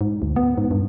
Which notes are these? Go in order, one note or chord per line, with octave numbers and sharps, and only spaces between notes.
G#2
D2
B3
G#2
G2